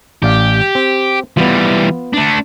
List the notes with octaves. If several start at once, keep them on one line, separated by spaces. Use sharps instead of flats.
A1 G4 D5 F5
C4
E3 G3 B3 F4
A3 D4